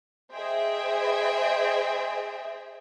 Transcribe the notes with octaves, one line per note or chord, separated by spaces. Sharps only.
G#4 C5 D#5 E5 G5